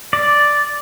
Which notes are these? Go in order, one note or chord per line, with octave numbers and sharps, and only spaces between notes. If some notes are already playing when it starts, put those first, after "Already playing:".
D5